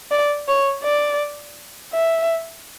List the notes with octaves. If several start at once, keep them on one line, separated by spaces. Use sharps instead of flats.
D5
C#5
D5
E5